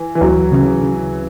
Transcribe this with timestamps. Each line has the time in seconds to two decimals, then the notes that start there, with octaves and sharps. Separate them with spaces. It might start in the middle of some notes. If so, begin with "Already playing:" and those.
Already playing: E3
0.15 E3
0.21 D2 F#3
0.52 C#3
0.82 C#3